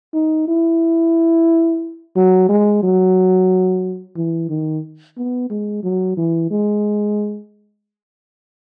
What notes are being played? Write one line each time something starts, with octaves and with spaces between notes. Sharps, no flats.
D#4
E4
F#3
G#3
F#3
E3
D#3
B3
G#3
F#3
E3
G#3